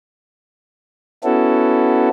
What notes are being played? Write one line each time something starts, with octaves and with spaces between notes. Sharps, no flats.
B3 C#4 E4 F#4 A4